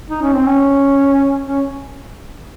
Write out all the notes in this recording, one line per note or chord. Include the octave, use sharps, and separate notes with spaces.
D#4
C#4
C4
C#4
C#4